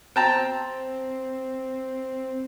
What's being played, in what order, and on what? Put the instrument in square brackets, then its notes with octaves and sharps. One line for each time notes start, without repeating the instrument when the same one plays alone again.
[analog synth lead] C4 [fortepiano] G5 A5 A#5